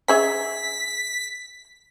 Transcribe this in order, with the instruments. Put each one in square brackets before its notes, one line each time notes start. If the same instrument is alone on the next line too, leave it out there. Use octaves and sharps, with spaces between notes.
[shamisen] C#4 G#4 E5 [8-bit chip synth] B6